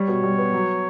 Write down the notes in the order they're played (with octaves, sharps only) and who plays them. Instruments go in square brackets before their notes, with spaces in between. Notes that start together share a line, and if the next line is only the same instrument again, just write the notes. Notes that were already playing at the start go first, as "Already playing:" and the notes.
Already playing: [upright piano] G3 [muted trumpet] C#5
[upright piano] B2
G3
B3
F#3